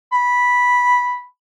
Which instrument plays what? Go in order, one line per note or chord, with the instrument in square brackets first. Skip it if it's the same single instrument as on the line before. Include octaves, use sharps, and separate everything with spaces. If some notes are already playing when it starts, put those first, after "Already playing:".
[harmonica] B5